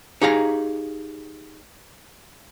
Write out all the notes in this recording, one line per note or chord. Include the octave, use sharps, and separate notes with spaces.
D#4 G4 G#4 F5 A5 A#5